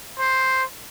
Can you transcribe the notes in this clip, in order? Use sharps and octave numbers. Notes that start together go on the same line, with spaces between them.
C5